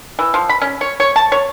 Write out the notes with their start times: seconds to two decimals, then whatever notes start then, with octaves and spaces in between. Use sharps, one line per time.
0.19 E3
0.34 F3
0.49 B5
0.61 C#4
0.81 C#5
1.00 C#5
1.16 A5
1.32 C#5